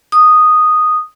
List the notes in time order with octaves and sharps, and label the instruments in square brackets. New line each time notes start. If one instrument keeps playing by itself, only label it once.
[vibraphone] D#6